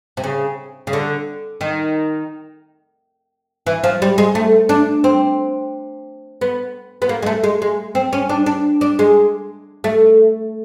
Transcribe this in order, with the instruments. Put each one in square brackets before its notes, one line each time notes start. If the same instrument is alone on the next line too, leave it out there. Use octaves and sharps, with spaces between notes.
[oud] C3
C#3
C#3
D3
D#3
E3
F3
G3
G#3
A3
D4
C4
B3
B3
A#3
G#3
A3
G#3
G#3
C4
C#4
D4
D4
D4
G#3
A3